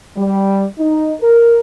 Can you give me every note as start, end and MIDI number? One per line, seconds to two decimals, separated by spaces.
0.17 0.65 55
0.78 1.13 63
1.21 1.59 70